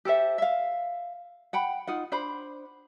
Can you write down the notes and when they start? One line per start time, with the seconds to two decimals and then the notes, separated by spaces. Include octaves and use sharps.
0.05 G4 A4 C5 E5
0.38 E5 F5
1.53 F#5 G5 B5
1.87 D#4 F4 F#5
2.12 D4 C5 B5